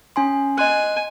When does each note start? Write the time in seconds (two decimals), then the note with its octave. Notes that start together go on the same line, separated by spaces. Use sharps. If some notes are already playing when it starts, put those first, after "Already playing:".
0.16 C#4 G#5 C6
0.58 D#5 G#5 C6 F#6